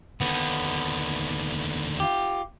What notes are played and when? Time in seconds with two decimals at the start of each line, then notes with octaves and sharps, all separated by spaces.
0.21 D#2 D3 B3
2.00 F4 G4